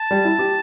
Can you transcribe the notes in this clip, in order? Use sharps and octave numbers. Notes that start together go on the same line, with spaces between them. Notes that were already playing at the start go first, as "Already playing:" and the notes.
Already playing: A5
G3
E4
G4